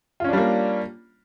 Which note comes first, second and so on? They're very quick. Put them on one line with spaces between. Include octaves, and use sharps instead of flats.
F4 C#4 D4 G3 A#3